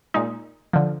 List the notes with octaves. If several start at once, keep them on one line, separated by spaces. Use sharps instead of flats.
A#2 G#3 D#4
D3 F3